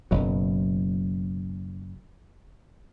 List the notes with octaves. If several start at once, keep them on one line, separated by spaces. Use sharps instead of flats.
F#1 B2 F#3